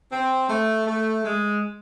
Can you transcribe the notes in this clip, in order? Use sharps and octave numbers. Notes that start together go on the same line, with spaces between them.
C4
A3
A3
G#3